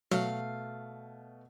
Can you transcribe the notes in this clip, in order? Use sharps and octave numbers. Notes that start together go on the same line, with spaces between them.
B2 F#3 A3 F5